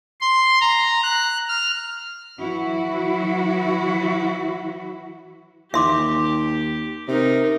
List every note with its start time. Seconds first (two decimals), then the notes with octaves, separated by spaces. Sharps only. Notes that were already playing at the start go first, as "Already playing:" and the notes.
0.21 C6
0.61 A#5
1.03 F#6
1.48 F6
2.39 E3 F#3 E4 F#4
5.74 D#2 G4 E5 C6 D6
7.08 C3 D#4 A#4